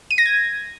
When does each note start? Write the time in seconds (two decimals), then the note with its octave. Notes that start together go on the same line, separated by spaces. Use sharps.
0.11 D#7
0.18 A#6
0.25 G#6